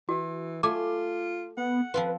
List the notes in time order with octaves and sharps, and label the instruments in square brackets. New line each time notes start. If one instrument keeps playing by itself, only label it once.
[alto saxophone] E3 [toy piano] F#4
[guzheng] A3 G#5 [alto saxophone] F4 [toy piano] D6
[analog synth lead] B3 [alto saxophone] F#5
[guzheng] F3 C4 F4 [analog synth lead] B4